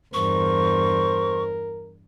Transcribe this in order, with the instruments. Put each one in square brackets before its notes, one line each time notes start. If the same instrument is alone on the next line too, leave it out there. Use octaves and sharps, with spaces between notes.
[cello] E2 G2 [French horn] A#4 [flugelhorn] C5 [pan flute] C#6